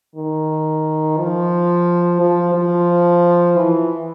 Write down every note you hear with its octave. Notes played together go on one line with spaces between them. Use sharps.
D#3
F3
F3
F3
E3